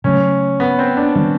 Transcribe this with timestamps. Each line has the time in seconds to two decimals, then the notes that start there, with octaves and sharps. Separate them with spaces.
0.04 C#3 F#3 A3 C#4
0.60 B3
0.79 C4
0.97 D4
1.16 D#3 G3 C4